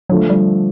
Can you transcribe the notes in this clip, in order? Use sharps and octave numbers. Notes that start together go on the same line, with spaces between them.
D3 F3 F#3 A3
G3